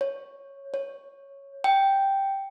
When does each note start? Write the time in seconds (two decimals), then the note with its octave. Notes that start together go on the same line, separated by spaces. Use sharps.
0.01 C#5
0.74 C#5
1.64 G5